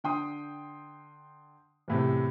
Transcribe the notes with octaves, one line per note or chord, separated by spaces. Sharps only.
D3 G5 C6 D#6
E2 A2 C3